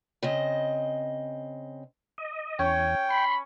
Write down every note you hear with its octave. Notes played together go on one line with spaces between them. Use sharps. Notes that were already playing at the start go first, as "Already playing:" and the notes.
C#3 C4 D#5
D#5
E2 C#4 G5
B5 C6